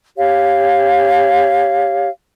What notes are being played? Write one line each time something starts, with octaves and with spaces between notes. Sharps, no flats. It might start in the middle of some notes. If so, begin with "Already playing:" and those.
G4 C#5 F5